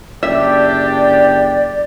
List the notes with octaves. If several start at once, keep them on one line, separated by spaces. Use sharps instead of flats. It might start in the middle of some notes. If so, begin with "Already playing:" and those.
F#1 D4 G4 D5 E5